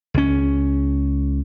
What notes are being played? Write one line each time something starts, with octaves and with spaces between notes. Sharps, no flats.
C#2 C#4